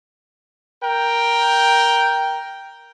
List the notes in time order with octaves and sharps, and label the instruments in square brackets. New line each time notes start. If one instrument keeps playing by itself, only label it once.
[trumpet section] A#4 G5